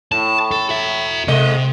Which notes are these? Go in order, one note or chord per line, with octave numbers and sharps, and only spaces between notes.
A2 A5
A4
F#4 E5
C3 G#3 D#5